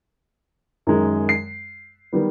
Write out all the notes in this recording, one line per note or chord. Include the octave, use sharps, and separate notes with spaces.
F#2 D#3 G#3
C7
D#3 G3 B3